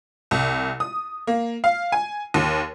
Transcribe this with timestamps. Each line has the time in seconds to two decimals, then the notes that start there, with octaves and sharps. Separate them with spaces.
0.31 C2
0.80 D#6
1.27 A#3
1.64 F5
1.92 G#5
2.34 D#2